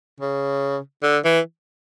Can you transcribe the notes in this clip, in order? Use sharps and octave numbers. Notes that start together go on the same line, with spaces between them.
C#3
D3
E3